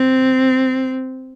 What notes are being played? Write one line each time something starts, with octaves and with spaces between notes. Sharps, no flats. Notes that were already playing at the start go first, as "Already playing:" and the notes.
Already playing: C4